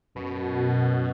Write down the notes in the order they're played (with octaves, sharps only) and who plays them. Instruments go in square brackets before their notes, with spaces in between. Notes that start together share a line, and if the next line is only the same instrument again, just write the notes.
[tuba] F#2 [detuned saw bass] B2